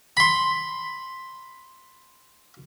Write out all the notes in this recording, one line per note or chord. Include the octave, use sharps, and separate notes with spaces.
B5 C6